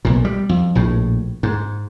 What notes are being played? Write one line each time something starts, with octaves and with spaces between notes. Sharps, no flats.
B1 A#2
G3
F2
A#1 A2
G#2